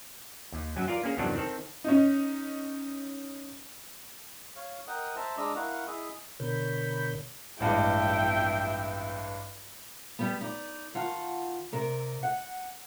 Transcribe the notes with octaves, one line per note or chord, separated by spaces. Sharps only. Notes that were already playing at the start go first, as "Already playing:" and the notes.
D#2
F#2 F#3 G#5
F4 A#4 D5
A#3 C#4 G#4
E2 G2 C3 D#3 F#3 D4
D#3 C4 A4
C#4 D#4
C#5 F5
A#4 D#5 F#5 G5 D#6
C5 E5 A5 A#5
G#3 D4 D#5 A#5 D6 E6
E4 A#4 F5 F#5 C#6
E4 G#4 D#5 E5
B2 D3 A#4 C#5 B5 G6
A1 G2 G#3 E5 G5
G3 B3
D#4 D5
D#3 F4 F#5 A5
C3 A#4 D5
F#5